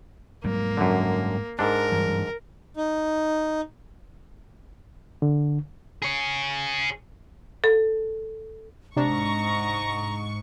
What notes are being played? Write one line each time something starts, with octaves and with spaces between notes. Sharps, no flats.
G#2 F#3 G3 A#3
F#2 D3
G#2 D4 A#4
G2 E3 F#3
D#4
D3
G#4 C#5
A4
G#2 C3 D4 A#5 C#6